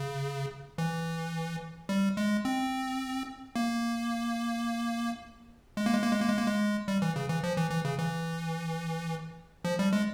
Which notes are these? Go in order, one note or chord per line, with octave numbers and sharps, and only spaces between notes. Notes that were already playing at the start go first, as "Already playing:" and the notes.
Already playing: C#3
E3
G3
G#3
C4
A#3
G#3
A#3
G#3
A#3
G#3
A#3
G#3
A#3
G#3
G3
E3
C#3
E3
F3
E3
E3
C#3
E3
F3
G3
G#3